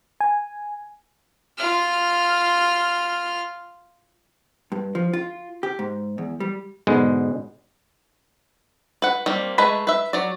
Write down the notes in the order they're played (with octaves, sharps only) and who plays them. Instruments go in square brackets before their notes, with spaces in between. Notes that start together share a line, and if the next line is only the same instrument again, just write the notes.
[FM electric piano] G#5
[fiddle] F4 F6
[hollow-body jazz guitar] G2
F3
F4
G4
G#2
E2
G3
[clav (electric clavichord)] G#2 B2 D3 G#3 B3
[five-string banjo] B4 F#5
G3 A#3 C4
G#3 A3 B4 B5
B4 E5
F#3 D5